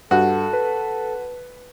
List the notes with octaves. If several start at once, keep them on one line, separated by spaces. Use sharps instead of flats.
G2 F#4 A4
B4